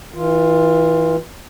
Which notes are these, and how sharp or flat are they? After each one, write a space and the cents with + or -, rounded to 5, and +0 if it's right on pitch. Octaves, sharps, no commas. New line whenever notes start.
E3 -30 F4 +0